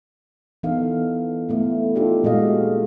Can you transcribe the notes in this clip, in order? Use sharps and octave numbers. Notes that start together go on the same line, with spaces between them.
E3 B3 D#4 A4 F5
A3 B3 E4
D#4 F4 G4 A4 D5
A#2 G#3 F#4 D#5 F5